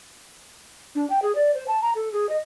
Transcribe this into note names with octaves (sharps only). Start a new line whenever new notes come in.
D4
G5
G#4
D5
C5
A5
A#5
A4
G#4
D#5